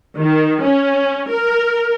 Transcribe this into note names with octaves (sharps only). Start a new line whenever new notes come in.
D#3
C#4
A#4